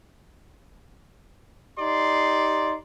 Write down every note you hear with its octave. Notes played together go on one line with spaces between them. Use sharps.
D#4 G4 D5 C6